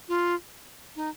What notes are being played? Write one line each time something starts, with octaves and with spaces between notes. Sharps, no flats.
F4
D#4